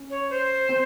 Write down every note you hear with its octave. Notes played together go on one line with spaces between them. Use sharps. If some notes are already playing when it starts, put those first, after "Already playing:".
Already playing: C#4
C#5
C5
C4